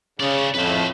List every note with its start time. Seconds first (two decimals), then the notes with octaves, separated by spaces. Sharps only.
0.20 C#3 C#4 D5
0.54 F2 A2 B4 C5